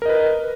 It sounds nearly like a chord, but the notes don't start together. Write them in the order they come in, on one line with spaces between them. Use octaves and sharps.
A#4 D#5 B4